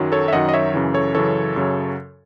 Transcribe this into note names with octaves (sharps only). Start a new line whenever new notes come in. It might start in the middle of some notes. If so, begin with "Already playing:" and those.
Already playing: F#2 D#3 F#3
A4 C#5
E5
F#2 D#3 F#3 D#5 F#5
D#5
C#5 E5
F#2 C#3 E3
A4 C#5
F#2 C#3 E3 A4 C#5
F#2 C#3 F#3